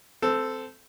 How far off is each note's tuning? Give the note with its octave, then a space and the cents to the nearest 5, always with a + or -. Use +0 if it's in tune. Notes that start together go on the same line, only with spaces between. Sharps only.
C4 -15 A4 +0